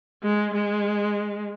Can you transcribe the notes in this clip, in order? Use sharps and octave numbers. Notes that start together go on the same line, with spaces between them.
G#3
G#3